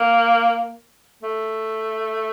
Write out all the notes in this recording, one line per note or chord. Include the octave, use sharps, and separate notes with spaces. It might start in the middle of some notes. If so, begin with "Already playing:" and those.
Already playing: A#3
A3